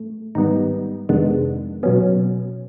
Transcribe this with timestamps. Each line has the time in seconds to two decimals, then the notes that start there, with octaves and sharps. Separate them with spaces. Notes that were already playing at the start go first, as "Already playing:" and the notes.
Already playing: A2 A3
0.35 G#2 D#3 G3 B3 D#4
1.09 F2 C3 D#3 G#3 B3 D4
1.83 B2 F#3 B3 C#4